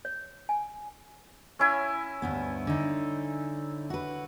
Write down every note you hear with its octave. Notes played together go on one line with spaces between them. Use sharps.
C#5
G#5
C#4 E4 G#5
D2 G2 B3
D3 D#4
F#4 B4